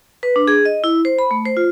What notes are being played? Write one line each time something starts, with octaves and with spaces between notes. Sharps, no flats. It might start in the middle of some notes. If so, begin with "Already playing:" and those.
B4
D4
G#4
D#5
E4
C5
B5
A3
C5
F4